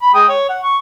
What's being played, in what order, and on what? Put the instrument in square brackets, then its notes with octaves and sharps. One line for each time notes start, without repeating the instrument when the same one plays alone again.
[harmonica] B5
G#3 G5 D#6
C#5
F#5
C#6